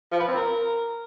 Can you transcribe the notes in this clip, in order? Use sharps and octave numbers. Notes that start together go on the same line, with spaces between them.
F3
B4
C4
A#4